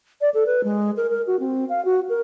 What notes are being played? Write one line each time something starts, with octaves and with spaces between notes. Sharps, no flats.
D5
A4
B4
G#3
A#4
A#4
F#4
C4
F5
F#4
A#4